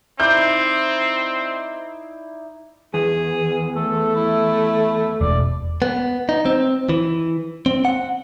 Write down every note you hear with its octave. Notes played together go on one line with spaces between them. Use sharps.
C4 D#4 E4 D5 G6
E2 G#4
A3 A4
E4
E1 D5
B3
D#4
C4
E3
C4
F#5